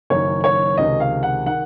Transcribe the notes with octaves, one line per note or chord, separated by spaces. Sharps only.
F#1 F#2 D#3 C#5
C#5
C#2 C3 D#3 D#5
F5
F#5
D#3 F#5